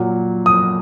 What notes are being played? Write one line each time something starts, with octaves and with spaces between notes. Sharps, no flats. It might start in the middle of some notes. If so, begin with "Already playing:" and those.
Already playing: A#2 F#3
D#6